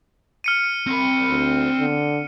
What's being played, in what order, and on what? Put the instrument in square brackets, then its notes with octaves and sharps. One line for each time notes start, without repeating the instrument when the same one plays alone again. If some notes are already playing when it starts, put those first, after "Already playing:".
[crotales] F6 C#7 D#7
[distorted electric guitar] C4 B5
[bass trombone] D2
D3